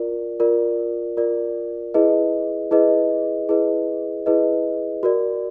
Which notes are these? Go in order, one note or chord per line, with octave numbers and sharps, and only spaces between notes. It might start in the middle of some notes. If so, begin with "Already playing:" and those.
Already playing: F4 A#4 D5
F4 A#4 D5
F4 A#4 D5
E4 G#4 B4 D#5
E4 G#4 B4 D#5
E4 G#4 B4 D#5
E4 G#4 B4 D#5
F#4 A#4 D5